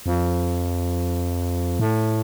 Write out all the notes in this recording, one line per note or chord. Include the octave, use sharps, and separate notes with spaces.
F2
A2